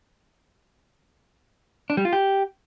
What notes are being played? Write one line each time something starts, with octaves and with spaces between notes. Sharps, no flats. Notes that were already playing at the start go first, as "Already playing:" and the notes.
D4
G3
F4
G4